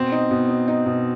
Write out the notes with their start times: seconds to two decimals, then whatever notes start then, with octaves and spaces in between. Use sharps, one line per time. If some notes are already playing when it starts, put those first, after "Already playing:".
Already playing: B2 C4
0.12 D#4
0.31 B2
0.49 D#4
0.68 D#4
0.86 B2